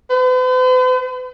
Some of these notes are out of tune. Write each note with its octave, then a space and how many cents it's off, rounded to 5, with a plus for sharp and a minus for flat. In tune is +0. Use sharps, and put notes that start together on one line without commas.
B4 +45